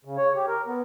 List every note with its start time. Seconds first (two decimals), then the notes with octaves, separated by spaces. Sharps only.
0.05 C#3
0.17 C#5
0.35 G4
0.47 A#4
0.67 B3